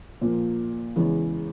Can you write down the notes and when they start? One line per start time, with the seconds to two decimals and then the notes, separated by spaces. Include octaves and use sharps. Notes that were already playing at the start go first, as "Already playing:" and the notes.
0.21 A#2 F3 A#3
0.96 E2 C#3 E3 G#3